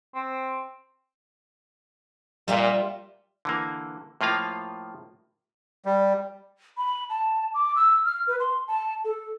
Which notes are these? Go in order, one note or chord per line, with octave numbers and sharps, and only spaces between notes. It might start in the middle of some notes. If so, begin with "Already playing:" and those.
C4
A#2 G3 F4 E5
D3 E3 A#3
A2 F3 A#3 F4 F5
G3
B5
A5
D6
E6
F6
B4
C6
A5
A4